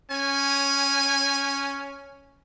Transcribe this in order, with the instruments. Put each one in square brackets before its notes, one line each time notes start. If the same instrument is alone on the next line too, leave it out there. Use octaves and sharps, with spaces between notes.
[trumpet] C#4 [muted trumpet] G#5